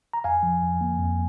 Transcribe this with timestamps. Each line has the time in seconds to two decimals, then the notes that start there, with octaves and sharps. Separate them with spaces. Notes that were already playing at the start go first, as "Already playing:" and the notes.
0.13 A#5
0.24 F2 F5 G#5
0.43 F3
0.62 F2
0.81 A#3
0.99 F2